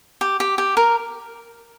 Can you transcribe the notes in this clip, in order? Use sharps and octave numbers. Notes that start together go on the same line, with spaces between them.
G4
G4
G4
A#4